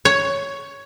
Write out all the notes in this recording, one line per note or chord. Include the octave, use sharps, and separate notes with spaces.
C#5